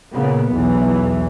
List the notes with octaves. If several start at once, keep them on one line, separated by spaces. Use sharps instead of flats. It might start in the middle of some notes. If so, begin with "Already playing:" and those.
A#2 C#3 A#3 B3
B1 E2 E3